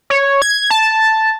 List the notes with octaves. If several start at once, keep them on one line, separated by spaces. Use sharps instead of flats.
C#5
G#6
A5